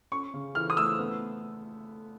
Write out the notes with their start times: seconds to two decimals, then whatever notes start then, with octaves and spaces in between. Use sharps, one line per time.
0.12 C#4 C#6
0.34 C#3
0.55 E3 F6
0.70 D#6
0.77 A3 E6
0.99 B3